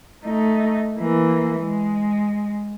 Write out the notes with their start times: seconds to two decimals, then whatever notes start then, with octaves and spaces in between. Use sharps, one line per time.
0.25 A3 D#4
0.97 E3 A#3
1.61 G#3